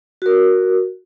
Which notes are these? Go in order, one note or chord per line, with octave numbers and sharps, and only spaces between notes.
F#4 A#4